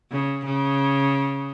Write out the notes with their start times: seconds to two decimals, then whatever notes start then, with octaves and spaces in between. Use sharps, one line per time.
0.11 C#3
0.45 C#3